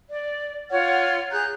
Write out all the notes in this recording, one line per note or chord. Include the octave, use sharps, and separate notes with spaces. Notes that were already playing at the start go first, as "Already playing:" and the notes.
D5
F4 C#5 F#5 F6
G#4 A#5 F#6 G6